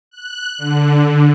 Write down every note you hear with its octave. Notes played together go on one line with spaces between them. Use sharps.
F#6
D3